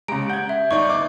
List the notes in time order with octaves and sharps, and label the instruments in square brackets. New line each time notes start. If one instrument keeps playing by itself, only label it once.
[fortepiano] C#3 A#5 [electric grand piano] G#3 G4 [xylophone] D7
[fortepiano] F#5 [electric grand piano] G6 G#6
[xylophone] E5
[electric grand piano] G1 D#4 D5 [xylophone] C#6
[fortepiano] D6